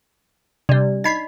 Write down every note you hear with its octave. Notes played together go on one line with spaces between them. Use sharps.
C3 G3 D4 D5
D#4 D#5 B5 G#6 B6 C7